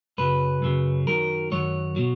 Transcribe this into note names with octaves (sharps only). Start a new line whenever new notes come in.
F#2 C#3 F#3 B4
F#2 C#3 F#3
F#2 D#3 F#3 A#4
F#2 D#3 F#3 C#5
B2 F#3